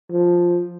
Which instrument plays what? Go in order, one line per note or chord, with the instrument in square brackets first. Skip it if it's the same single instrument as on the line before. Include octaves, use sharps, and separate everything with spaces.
[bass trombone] F3